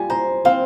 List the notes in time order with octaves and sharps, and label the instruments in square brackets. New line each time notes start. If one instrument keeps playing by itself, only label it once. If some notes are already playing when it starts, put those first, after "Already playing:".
Already playing: [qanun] G3 F4 [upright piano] G#5
[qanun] C5 [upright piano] A#5
[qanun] C4 [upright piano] F5